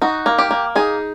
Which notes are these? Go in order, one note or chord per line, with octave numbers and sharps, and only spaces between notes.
D#4 F#4
A#3
G4
A#3
D#4 G#4